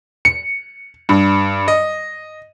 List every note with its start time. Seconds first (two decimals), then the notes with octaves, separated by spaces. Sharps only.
0.25 C#7
1.09 G2
1.68 D#5